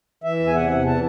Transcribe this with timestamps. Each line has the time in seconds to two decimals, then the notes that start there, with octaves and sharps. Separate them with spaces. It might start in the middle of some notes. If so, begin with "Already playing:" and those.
0.24 E3 E5
0.40 E2
0.47 G#5
0.55 C3 F#5
0.70 E2
0.86 E3 A5